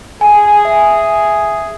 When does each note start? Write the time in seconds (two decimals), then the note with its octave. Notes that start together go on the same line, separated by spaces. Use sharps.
0.21 G#4 G#5
0.65 E5